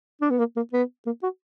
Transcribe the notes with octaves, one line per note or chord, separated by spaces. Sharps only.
D4
B3
A#3
A#3
B3
A#3
F#4